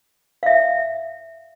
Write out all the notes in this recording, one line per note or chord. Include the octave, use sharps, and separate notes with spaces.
E5 F5